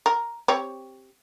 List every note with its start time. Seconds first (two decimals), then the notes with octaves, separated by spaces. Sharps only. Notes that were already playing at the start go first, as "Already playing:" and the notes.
0.06 A#4
0.48 C4 G4 C#5